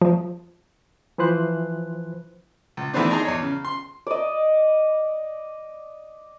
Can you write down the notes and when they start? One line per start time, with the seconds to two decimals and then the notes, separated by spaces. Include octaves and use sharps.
0.02 F3
1.18 E3 F3 B4 C5 F#6
2.77 C#2
2.93 D#3 E3 A3 B3 C4 D4
3.10 D#4 G#4 D5 A5 A#5 C6
3.25 E2 C#5
3.42 C#3
3.65 C6
4.07 D5 D#5